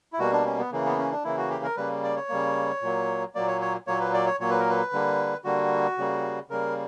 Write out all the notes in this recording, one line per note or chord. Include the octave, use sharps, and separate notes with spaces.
E4
B2 G3 A#3 F#4
D4
C#4
B3
C#3 E3 A#3
B3
C#4
D4
C#3 E3 A#3 E4
F#4
G4
A#4
C#3 G3 A#3 B4
D5
C#5
C#3 G3 A#3
A#2 F#3 A#3
A#2 F#3 A#3 D5
C#5
C#5
A#2 F#3 A#3 C#5
B4
D5
C#5
A#2 F#3 A#3 C#5
B4
A#4
B4
D3 G3 A#3
D3 G3 A#3 F#4
C#3 G3 A#3
C#3 G3 A#3 A#4